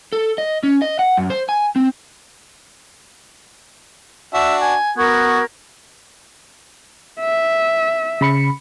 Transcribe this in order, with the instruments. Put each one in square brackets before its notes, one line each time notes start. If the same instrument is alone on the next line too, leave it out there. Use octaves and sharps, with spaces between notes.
[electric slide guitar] A4
D#5
C#4
D#5
F#5
F#2
C5
G#5
C4
[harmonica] D4 F#4 [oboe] E5
[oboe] G#5
[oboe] B3 [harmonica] F#4 [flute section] A#4 C#6 G#6
[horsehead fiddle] E5
[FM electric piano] C#3 B5 C#7